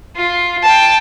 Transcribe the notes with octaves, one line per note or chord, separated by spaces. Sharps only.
F4
G5 A5